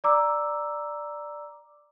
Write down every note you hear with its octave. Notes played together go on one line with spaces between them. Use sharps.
D5 A#5 D6 E6